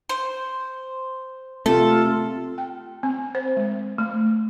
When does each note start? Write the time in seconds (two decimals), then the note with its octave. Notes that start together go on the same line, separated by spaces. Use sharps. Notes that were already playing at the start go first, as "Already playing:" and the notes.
0.09 C5
1.66 C3 A3 F4 A4
2.58 G5
3.03 C4
3.35 C5
3.57 G#3
3.98 A3